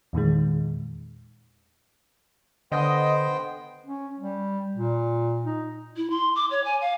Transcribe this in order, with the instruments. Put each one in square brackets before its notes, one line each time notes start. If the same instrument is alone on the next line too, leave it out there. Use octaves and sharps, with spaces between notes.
[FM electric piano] E2 A#2 D#3 G#3
[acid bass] D3 [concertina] B3 C5 G5 [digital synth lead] D#5
[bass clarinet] C#4
G3
A#2
D#4
[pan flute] E4
C6
D6
C#5
G#5
F5